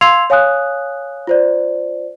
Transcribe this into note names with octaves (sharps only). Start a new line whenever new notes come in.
F5 C6 E6 G#6 C7 F7
C#5 F5 G#5 D#6 F#6
F4 C5 D5